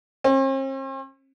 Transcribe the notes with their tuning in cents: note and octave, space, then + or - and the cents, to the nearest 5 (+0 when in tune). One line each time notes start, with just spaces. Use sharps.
C4 +45